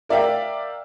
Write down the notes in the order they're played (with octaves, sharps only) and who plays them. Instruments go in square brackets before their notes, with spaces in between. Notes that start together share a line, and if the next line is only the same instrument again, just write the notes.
[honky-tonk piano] A#4 D5 E5 F5 G5